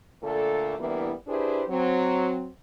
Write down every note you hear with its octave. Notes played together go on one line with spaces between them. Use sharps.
A#2 D3 A3 A#3 A4
D2 E3 G3 A#3 B3 E4
D4 E4 G4 G#4 B4 C5
F#3 C4